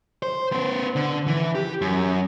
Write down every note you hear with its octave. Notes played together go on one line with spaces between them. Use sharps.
C5
B3 C5
D3
E3
G4
F#2